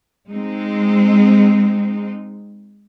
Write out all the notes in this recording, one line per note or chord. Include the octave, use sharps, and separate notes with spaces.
G#3 C4 D#4